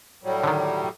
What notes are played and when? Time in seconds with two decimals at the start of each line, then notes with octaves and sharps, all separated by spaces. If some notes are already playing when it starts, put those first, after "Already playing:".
0.24 A2 F#3 G3
0.44 D3 D#3